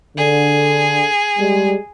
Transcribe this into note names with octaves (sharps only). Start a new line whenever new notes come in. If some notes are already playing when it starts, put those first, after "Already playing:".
D3 G#4
G3 G#3